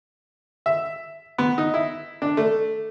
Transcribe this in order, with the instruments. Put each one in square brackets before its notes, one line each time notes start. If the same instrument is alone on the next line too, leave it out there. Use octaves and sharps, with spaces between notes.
[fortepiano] E5
B3
D#4
E4
D4
A3